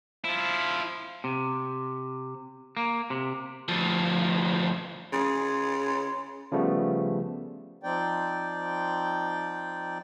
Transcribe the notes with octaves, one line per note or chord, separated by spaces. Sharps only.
F3 E4 F4
C3
A#3
C3
D2 F3
C#3 C6
C#3 F3 G3 A3 B3
F3 C4 D#4 D5 G5